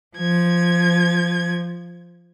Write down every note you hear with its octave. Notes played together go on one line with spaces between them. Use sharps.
F3 G#6